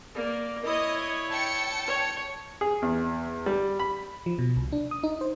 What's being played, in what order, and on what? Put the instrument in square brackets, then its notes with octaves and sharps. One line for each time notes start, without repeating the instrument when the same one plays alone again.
[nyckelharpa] A#3 D5
[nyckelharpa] E4 C#5 [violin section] D#5
[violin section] G5 A5 C#7
[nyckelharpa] C#5
[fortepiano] G#4
E2
G3
B5
[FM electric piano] F3
B2
C2
D4
D#6
D#4
C5